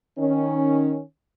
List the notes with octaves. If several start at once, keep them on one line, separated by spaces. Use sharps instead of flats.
D#3 C#4